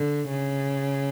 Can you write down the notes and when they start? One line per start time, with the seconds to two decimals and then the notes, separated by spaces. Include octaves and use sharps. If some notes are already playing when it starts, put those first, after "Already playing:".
Already playing: D3
0.29 C#3